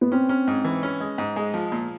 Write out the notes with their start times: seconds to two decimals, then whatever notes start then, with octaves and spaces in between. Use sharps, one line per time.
0.01 B3
0.12 C4 C#4
0.29 C#4
0.48 G#2
0.65 E3
0.83 C#4
1.01 G#3
1.18 G#2
1.36 G#3
1.54 F3
1.72 A#2